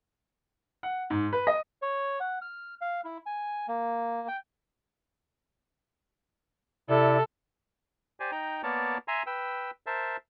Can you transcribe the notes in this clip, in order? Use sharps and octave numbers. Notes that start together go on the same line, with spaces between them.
F#5
G#2
B4
D#5
C#5
F#5
F6
F5
E4
G#5
A#3
G5
C3 E4 A4 D5
G4 C5 D5 G#5
D#4 G5 A#5
A#3 B3 A#4 C#5 D5 A5
E5 G#5 A#5 C6
B4 G5 E6
A#4 C5 E5 A5